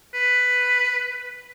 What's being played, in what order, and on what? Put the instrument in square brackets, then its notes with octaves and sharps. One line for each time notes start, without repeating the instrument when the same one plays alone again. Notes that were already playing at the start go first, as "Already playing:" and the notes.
[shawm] B4